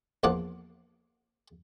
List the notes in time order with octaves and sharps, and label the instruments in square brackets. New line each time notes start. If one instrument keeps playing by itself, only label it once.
[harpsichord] A#1 E2 F3 A#3 F#5 D6